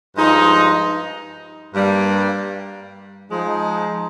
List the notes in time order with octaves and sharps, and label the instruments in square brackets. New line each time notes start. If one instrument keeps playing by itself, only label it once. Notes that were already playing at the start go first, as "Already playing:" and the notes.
[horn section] G2 F3 G#3 D#4
G2 G3 A#3
F3 G#3 D#4